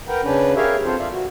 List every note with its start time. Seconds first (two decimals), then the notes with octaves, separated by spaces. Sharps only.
0.08 A#4 B4 F#5 G5 A#5
0.23 C#3 C#4 D4 B4
0.56 G4 G#4 A#4 C#5 E5 F5
0.84 C4 F4 A4 C5
0.99 D5 E5 F5
1.12 F#4